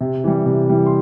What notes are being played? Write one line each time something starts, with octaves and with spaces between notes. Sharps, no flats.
C3
E3 G3
C3
E3 G3
C6